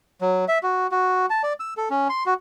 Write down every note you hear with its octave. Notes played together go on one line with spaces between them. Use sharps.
F#3
E5
F#4
F#4
A5
D5
E6
A4
C#4
C6
F#4